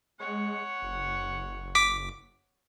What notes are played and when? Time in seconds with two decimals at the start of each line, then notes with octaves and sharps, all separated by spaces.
0.19 G#3 C#5 F#5
0.82 F#1
1.75 D6 B6